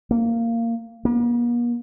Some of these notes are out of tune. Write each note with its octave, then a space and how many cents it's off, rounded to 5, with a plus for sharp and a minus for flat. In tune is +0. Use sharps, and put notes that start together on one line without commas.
A#3 -15
A#3 +45